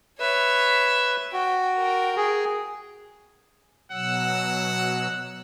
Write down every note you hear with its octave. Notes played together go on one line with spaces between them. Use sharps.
B4 C#5 E5
F#4 G5
A#4 G5
G#4
B2 F#3 F#5 E6